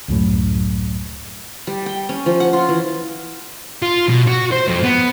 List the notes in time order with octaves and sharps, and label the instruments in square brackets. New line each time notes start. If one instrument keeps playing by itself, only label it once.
[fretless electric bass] C#2 F#2 A2
[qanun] G3
G5
C#4
F3
F#5
F4
E3
[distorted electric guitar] F4
B2
F#4
C5
F2
B3